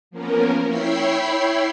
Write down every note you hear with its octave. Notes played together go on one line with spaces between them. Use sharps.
F3 A#3 B3 C#4 A#4
E4 C#5 G5 B5 E6 C7